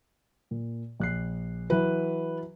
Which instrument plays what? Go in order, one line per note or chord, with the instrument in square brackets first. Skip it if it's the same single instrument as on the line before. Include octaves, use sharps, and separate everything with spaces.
[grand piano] A#2
A#1 F#6 C7
[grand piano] E3 F#3 [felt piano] B4